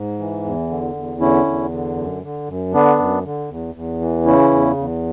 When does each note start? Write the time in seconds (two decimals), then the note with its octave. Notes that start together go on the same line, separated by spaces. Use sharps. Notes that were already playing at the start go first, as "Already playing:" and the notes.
Already playing: G#2
0.19 E3
0.44 E2
0.69 D3
0.95 E2
1.21 D3 C#4 E4
1.46 E2
1.72 D3
1.97 F#2
2.23 D3
2.48 F#2
2.73 D3 B3 D4
2.98 F#2
3.24 D3
3.50 E2
3.75 E2
4.01 E3
4.25 C#3 C#4 E4
4.52 E2
4.77 E2